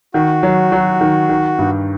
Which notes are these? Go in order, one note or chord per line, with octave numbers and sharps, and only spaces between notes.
D#3 F#4
F#3
F#3
D#3
D#3
G2